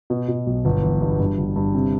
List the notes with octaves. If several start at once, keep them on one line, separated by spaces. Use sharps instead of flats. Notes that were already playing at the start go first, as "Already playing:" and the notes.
B2
B2
B1
G1
E3
G2
G2
G1
G2
C3